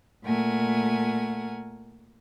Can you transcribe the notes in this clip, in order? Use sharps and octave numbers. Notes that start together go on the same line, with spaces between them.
A#2 A3 A#4 F#5 G#5